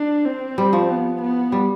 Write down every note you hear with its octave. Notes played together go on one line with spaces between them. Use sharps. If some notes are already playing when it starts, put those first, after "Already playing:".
Already playing: D4
C4
G3
F3
B3
B3
G3